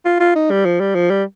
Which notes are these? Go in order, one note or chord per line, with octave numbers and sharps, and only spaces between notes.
F4
F4
D#4
G3
F3
G3
F3
G3